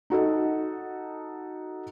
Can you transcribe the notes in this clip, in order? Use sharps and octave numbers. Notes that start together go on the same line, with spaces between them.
D#4 F#4 A4 D#5